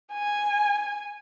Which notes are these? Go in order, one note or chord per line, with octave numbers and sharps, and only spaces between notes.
G#5